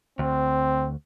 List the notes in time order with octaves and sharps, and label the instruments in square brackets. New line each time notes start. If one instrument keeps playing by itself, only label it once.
[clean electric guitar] D2 [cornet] C4